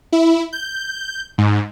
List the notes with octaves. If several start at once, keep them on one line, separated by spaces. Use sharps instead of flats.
E4
G6
G#2